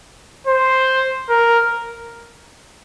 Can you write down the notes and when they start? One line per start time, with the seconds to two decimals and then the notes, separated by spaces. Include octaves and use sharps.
0.47 C5
1.30 A#4